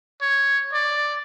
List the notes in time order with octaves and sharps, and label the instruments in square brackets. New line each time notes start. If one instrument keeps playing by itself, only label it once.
[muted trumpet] C#5
D5